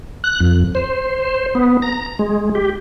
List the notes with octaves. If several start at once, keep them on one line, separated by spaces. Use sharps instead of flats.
F#6
F2
C5
B3
A#5
G#3
G4